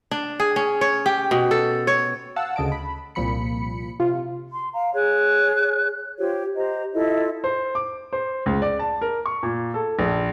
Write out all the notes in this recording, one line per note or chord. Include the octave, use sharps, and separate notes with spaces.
D4
G#4
C#4
C#5
G4
B2
A4
C#5
F5 F#5 A5 E6
D2 C#3 D#5 A5 D7
B5
C2 A#2 F3 B5 C#7
C3 F4
C6
F5 A#5
G#4 C#5 F#6
F4 G4 C5 C#5
G4 C5 D#5 A#5
E4 F4 A4 D#5
C5
D6
C5
C#2
D5
A5
A#4
C#6
A#2
A4
A#1